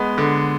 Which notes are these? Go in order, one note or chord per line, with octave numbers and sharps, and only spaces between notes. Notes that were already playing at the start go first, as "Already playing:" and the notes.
Already playing: G#3 B3
D3